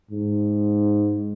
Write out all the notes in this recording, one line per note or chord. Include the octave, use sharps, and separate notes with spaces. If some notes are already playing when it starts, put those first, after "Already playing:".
G#2